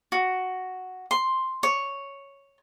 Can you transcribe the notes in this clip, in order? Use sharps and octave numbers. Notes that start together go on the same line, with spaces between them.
F#4
C6
C#5